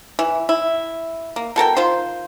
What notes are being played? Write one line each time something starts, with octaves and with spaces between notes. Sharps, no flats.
E3
E4
A#3
B2 A4 A#4 G5
D#3 F4 C5